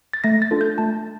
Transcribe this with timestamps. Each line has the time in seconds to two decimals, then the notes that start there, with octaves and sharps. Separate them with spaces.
0.13 A6
0.24 A3 A#6
0.42 A6
0.51 D4 F4 A4
0.61 G6
0.78 A3 A5